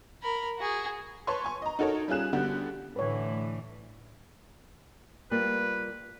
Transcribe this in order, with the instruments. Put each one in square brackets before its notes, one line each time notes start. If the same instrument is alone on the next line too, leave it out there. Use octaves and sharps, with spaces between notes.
[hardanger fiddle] A#4 B5
F#4 G#4
[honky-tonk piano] B4 C#5 A5 C6 C#6
G#5 C#6
D#5 A#5
D#4 F#4 A4 A#4 C#5
G3 C#4 F4 G#4 F#6 E7
D3 G3 B3 F#4 G4
[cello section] A2 D3 E3 [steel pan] B4 C#5
[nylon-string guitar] G3 A#3 F4 [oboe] B4